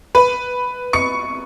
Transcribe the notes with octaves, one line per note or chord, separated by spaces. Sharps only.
B4 B5
C#6 C#7